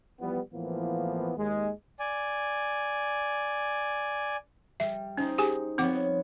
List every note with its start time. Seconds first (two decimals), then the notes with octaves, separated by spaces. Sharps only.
0.20 E3 F3 G3 B3
0.53 A2 E3 F3 A#3 B3
1.37 D#2 G#3
2.00 D5 G#5
4.80 G3 E5
5.17 C#4 D#4 C5
5.38 G4 G#4 G#5
5.78 F3 B3 C4 C#5 F#5 D6